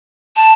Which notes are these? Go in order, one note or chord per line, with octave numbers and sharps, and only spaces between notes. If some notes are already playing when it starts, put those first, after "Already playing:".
A5